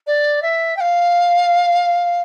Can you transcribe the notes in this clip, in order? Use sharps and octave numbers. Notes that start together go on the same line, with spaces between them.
D5
E5
G5
F5